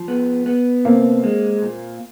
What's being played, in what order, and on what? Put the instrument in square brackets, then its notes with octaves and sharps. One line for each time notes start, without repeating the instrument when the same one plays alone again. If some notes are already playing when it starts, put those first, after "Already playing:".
Already playing: [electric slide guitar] F3
B3
B3
[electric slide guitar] C3 [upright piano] A#3 C4
[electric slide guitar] G#3
A#2